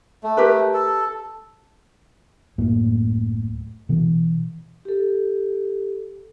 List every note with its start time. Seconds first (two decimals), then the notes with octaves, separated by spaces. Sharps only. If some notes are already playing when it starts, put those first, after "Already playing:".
0.23 A3
0.37 G4 A#4 B4
0.74 A4
2.58 D1 F#2 A2 A#3
3.89 B2 E3
4.85 G4 A4